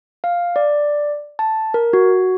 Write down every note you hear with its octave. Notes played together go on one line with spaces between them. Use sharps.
F5
D5
A5
A#4
F#4